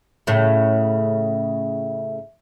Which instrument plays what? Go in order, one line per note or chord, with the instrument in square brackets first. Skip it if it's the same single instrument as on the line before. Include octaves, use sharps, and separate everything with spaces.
[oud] A2 C#3 [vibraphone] E5